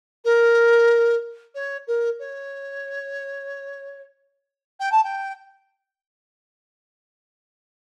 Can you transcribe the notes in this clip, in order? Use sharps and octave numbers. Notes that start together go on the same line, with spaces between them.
A#4
C#5
A#4
C#5
G5
A5
G5